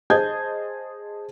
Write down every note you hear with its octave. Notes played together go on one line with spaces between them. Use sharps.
G#4 C5 D#5 A5 G6 G#6